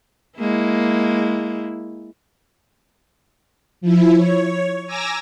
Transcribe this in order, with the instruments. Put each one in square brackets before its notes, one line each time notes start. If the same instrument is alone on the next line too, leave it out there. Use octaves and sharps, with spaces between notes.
[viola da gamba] G#3 A#3 E4
[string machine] F3 E4
C#5
G#5 A#5 D6 E6 A#6